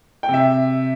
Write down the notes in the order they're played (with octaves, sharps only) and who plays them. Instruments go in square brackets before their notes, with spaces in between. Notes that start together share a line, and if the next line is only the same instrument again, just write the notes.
[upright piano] G5
C3
E5